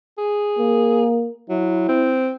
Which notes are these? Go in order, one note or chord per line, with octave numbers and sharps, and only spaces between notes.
G#4
A#3
F#3 E4
C4